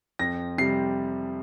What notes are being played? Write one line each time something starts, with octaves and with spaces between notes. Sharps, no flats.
F2 A#6
C3 G3 C7